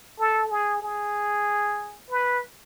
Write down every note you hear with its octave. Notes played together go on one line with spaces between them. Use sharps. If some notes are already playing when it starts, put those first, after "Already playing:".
A4
G#4
G#4
B4